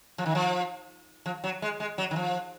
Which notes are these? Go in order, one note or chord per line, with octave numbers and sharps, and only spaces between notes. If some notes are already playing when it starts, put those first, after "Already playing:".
F3
D#3
F3
F3
F#3
G#3
G#3
F#3
D#3
F3